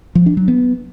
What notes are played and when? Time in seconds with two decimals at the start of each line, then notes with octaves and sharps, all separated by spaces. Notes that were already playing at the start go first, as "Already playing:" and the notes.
0.15 F3
0.26 D4
0.37 F#3
0.48 B3